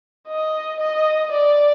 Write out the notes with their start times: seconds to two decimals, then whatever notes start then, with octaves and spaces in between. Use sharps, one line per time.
0.28 D#5
0.80 D#5
1.32 D5